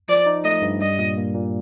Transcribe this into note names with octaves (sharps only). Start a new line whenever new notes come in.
F3 D5
D#4
A3 D#5
G2
G3 D#5
A#2
A#3
A#2